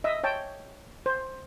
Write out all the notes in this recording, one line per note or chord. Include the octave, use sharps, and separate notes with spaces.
D#5 E5 E6
C#5 G5 A5
C5